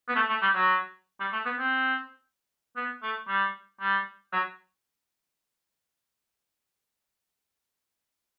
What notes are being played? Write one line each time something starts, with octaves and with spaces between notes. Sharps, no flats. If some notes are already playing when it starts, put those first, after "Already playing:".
B3
A3
A3
G3
F#3
G3
A3
B3
C4
B3
A3
G3
G3
F#3